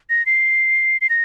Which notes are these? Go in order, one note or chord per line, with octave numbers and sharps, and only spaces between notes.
A#6
C7
C7
A#6